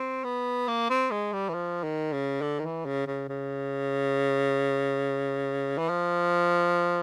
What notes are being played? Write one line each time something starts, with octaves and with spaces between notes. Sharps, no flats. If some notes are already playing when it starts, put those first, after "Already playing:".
Already playing: C4
B3
A#3
C4
G#3
G3
E3
F3
D#3
C#3
D3
D#3
E3
C#3
C#3
C#3
E3
F3